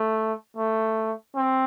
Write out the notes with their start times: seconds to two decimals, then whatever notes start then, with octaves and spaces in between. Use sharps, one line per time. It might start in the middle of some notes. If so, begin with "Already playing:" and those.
Already playing: A3
0.57 A3
1.36 C4